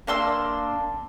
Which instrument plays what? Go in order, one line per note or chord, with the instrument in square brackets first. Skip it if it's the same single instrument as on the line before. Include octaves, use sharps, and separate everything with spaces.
[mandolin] A#3 D4 C6 E6